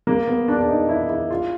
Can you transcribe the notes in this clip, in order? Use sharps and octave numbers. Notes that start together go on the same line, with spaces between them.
A#3
B3
D4
D4
D#4
E4
E4
F4